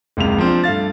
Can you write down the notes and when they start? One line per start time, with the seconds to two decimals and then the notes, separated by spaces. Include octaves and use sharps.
0.17 F#1 C#2 C3 F7
0.38 F3 C4 D4
0.64 G2 A3 F5 A6